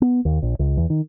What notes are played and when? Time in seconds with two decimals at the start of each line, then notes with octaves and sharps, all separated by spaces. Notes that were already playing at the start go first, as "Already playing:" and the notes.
0.02 B3
0.25 D#2
0.42 A#1
0.59 C#2
0.77 E2
0.90 D#3